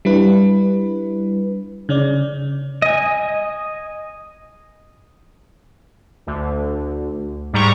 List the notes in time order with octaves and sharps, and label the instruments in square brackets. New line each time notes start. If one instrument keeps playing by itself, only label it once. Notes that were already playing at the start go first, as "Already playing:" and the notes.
[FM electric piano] G3 D4 E4 B4
C#3 C#4 D5
[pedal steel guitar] D#5 G#5
[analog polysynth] D2
G#2 G3 A#5 C#6